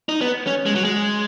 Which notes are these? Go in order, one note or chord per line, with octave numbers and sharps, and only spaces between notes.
D#4
B3
C#4
G#3
F#3
G#3